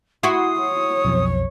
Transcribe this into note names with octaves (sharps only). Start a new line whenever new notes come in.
E4 F#4 C6 D#6
C#5
B1 F2 B2